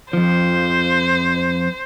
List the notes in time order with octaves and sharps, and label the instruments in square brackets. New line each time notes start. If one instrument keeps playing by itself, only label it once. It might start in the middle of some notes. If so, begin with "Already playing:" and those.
[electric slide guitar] F2 F3 [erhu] C5